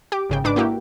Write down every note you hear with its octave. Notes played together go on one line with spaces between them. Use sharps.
G4 D6
G#1 C#3 G5
G#2 D4 B4 D6
A#3 E4 F#4 G4